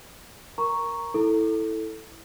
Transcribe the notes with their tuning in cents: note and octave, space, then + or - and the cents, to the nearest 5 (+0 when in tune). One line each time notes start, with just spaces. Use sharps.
A#4 +0 A#5 +0 C#6 +0
E4 -10 A4 +0